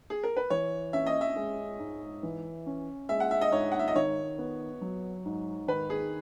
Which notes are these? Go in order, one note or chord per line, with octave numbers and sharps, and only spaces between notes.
G#4
A#4
B4
E3 C#5
C#4 E5
D#5
E5
G#3
G#2
E3
C#4
G#3 E5
F#5
E5
D#5
G#2 C#5
F#5
E5
D#5
D#3 C#5
B3
F#3
G#2
D#3 B4
G#4